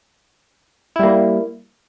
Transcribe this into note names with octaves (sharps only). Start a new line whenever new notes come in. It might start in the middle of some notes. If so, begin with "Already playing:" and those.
G3 A#3 E4